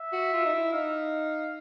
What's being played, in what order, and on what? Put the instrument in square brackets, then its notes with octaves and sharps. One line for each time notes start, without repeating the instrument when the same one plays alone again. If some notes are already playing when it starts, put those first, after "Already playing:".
Already playing: [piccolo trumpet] E5
[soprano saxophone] F#4
F4
D#4
E4
[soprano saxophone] D#4 [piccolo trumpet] F5